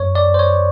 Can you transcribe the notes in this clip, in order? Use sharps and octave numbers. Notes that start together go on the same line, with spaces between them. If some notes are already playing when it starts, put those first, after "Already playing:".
Already playing: F#2 C#5
D5
F#2
C5
C#5